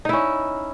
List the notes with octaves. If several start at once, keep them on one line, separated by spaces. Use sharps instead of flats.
C#4 D#4 E4